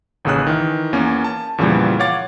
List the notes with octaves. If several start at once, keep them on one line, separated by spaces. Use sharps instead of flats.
A1 D#2 C#3 G#4 E6 F#6
D#3 E3
E2 A#3 C#4
A5
E2 A#2 C#3 E3 F3 G3
C#5 F5 F#5 D6 A6